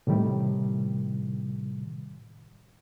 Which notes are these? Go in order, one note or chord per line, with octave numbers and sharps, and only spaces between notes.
A2 C3 D#3 G3